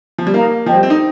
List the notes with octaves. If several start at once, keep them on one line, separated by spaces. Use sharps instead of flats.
F3
G3
A#3 D#4 A#4 F5 A#5
F3 C5 D#5 G5
G3
C4
D#4